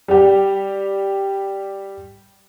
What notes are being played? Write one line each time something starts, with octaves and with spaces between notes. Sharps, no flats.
G3 G4